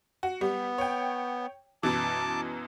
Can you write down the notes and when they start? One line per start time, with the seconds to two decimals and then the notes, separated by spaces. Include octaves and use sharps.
0.23 F#4
0.41 G3 B3
0.78 C#5 G5
1.83 F#2 B2 E3 A5 D6